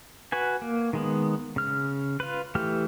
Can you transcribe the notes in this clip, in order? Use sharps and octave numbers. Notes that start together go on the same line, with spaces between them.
F#4 B4 G#5
A#3
D#3 G#3 B3
C#3 F6
F4 B4
E3 A3 G4 F6